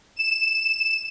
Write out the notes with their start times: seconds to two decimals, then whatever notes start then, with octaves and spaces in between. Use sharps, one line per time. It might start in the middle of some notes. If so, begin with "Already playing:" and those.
0.16 E7